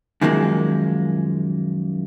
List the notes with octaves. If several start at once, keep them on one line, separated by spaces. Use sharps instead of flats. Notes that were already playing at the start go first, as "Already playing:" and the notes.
F#2 D#3 F3 G#3 A#3